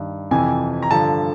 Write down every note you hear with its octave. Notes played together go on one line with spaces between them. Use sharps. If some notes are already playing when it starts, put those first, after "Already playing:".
Already playing: G2 D#3
F2 C3 E3 G#5
A#5
G2 D3 F3 A5